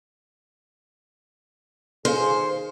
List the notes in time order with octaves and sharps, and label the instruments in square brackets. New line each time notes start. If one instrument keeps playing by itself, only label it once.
[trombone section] D#3 F4 G#4 [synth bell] A4 F5 [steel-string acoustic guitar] C5